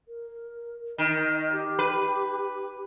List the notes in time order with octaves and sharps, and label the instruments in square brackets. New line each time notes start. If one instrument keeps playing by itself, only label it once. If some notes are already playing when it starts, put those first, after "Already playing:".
[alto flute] A#4
[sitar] D#3 [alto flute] D#5
[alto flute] G4
[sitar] B4